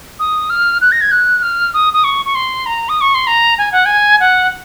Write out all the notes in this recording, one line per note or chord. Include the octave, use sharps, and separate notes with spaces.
D#6
F6
F#6
A#6
G#6
F#6
F6
D#6
D#6
C#6
C#6
C6
A#5
D#6
C#6
C6
A#5
G#5
F#5
G#5
F#5